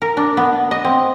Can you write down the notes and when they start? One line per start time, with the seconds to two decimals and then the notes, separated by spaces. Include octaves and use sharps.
0.02 A#4
0.17 D4
0.37 B3
0.71 D#5
0.85 C4